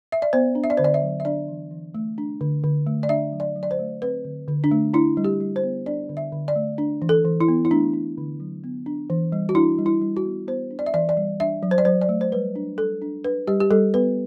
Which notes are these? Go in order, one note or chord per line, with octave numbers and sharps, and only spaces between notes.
E5
D5
B3 C5
D4
E5
D5
D3 C5
D5
E5
F#3
E5
D4 D5
E3
E3
A3
D4
D3
D3
A3
D5
D4 E5
F#3
D5
F#3
D5
C5
A3
C4 B4
D3
D3
D4
A3
D4 E4
G3
G4
G3
C5
B3
D4 D5
D3
E5
D3
D5
A3
D4
E3
A4
E3
E4
B3
E4
A3 D4
D4
D3
F#3
B3
D4
E3
G3
F#4
D4 E4
G3
E4
G3
F#4
B3
B3 C5
D4
D5
E5
E3 D5
D5
G3
D4 E5
F#3
C5
D5
F#3 C5
D5
A3
C5
G3 B4
D4
G3 A4
D4
D4 B4
G3 G4
G4
G3 A4
B3 B4